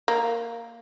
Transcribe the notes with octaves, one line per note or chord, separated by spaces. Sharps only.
A#3